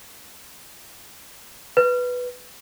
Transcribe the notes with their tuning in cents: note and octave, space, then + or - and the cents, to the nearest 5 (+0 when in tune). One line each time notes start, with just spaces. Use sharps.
B4 +0